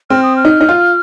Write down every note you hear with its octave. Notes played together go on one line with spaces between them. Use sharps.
C4 F6
D#6
F6
D#4
D#4
F4